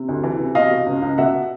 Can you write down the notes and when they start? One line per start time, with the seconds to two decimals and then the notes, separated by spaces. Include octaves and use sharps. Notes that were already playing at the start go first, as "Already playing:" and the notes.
Already playing: C3
0.09 D2
0.23 E3
0.40 C3
0.55 B2 D#5 F5
0.71 B2
0.86 C#2
1.02 C#2
1.18 B2 E5 F#5